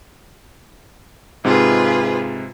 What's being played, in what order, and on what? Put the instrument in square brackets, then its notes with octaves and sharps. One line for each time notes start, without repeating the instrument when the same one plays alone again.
[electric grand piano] G#2 C3 G#3 [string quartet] F4 G#4 B4